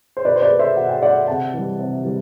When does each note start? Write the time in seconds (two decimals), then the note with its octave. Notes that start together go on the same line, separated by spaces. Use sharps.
0.17 C5
0.25 B2 B4 D5
0.36 C5
0.42 B4 D5
0.51 A3
0.59 C5 E5
0.77 B2 F#5
0.89 G5
1.02 A3 D5 F#5
1.27 C3 F#5 A5
1.54 E3 G3
1.79 C3
2.05 E3 G3